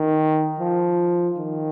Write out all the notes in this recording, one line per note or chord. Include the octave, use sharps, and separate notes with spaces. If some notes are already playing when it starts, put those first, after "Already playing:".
Already playing: D#3
F3
D#3